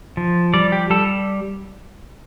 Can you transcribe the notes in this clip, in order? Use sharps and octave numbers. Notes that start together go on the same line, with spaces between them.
F3
G3 D5
G4
G3 A4